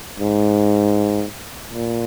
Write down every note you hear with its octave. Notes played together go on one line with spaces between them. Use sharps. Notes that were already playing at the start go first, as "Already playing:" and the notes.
G#2
A#2